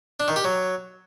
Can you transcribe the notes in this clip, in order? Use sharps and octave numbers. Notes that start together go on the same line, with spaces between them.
D4
D#3
G4
F#3